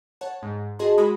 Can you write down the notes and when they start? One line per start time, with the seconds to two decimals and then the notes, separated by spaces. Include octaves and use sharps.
0.21 C#5 F#5 A5
0.42 G#2
0.79 F#4 G#4 D#5 A5 C6
0.98 G#3 F#4 B5 D#6